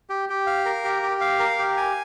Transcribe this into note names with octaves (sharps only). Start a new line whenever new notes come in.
G4
G4
F5
A#4
G4
G4
F5
A#4
G4
G#5